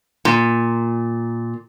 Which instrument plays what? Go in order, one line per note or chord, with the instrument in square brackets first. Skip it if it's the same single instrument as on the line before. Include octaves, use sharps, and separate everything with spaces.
[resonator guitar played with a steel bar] A#2